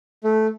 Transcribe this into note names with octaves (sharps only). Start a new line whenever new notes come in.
A3